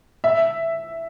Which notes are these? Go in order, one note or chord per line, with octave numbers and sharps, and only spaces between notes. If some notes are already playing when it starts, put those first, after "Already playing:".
E5